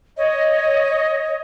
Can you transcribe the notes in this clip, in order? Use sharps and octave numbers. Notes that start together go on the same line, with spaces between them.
C#5 D#5